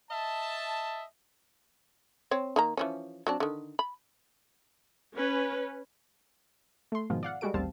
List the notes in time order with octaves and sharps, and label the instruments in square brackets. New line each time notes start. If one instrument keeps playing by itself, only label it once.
[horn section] D#5 E5 A5
[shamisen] C4 C#5
D#3 A#3 A#5
E3 F3 C#4
F#3 C4 D4
D3 D#3
B5
[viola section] C#4 B4
[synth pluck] A3 C6
G#2 B2 D#3 F3 G#3 F4
D5 F5 F#5
G3 G#3 F#4 A4 D7
A1 D#2 G3 C4 F5 A5